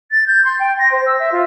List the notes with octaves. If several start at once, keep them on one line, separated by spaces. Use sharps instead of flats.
A6
G6
C6
G5
A#6
C5
E6
E5
F4